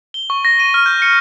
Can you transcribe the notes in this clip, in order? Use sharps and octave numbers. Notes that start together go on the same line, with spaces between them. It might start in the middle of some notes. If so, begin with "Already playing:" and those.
G7
C#6
A#6
D#7
F6
G6
C#7